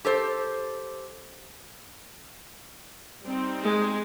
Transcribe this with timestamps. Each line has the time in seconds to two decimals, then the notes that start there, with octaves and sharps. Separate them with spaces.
0.05 G4 A4 C5
3.25 G3 C4 D#4
3.63 G#3